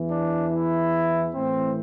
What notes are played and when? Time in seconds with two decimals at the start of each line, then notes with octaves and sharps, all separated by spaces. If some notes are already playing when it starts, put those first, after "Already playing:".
Already playing: E2 E3
0.10 D4
0.52 E4
1.34 A2 E3 C4